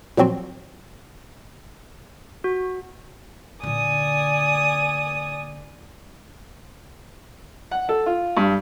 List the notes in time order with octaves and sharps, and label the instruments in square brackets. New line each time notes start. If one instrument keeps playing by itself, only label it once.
[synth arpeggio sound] A#2 F3 F#3 C4 F#4 C6
[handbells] F#4
[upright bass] A#2 D3 [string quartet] D5 G#5 D#6
[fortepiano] F#5
A4
F4
G2